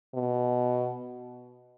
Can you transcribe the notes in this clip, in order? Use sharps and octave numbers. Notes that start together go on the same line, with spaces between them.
B2